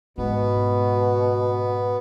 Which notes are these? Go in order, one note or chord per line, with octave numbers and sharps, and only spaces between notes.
G#2 B2 B3